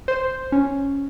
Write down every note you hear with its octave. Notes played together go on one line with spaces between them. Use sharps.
C5
C#4